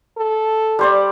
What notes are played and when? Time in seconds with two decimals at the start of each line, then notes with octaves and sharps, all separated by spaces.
0.18 A4
0.79 G3 C5 D5